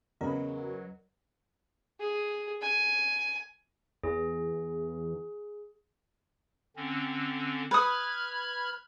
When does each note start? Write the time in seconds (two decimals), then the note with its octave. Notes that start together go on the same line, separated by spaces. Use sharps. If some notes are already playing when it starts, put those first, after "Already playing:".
0.21 E2 C#3 F#3 A#4 D#5 B5
2.00 G#4
2.62 G#5
4.04 E2 G#4
6.76 D3 C4 C#4
7.71 B4 B5 D#6 F6 G#6